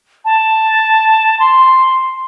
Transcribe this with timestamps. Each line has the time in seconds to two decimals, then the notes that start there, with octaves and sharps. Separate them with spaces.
0.25 A5
1.39 C6